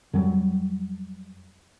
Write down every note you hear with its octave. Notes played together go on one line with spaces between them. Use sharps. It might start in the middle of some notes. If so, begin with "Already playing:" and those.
F2 F#3 G3